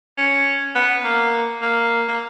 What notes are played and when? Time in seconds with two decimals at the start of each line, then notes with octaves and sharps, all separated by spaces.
0.18 C#4
0.75 B3
1.04 A#3
1.62 A#3
2.08 A#3